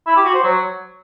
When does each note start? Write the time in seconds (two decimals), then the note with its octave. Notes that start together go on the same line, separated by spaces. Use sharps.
0.06 E4
0.16 G4
0.25 F#4
0.34 C5
0.43 F#3